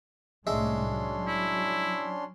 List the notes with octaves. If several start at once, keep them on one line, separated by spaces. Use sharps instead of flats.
C2 A2 G#3 A3 C#4 D4 E5 C6
F#3
E4